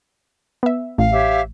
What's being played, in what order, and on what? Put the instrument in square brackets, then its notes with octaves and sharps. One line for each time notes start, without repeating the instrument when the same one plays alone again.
[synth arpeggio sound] B3 E5
[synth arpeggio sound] A1 [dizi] F5
[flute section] G4 C#5 E5